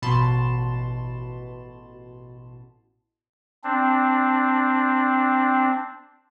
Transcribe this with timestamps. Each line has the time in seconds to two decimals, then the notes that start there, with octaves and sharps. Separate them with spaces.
0.02 A1 B2 A5 B5 C6 E7
3.64 C4 D4